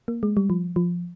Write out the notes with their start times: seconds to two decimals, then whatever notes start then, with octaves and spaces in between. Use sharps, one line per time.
0.08 A#3
0.23 G#3
0.37 G3
0.50 F3
0.76 F3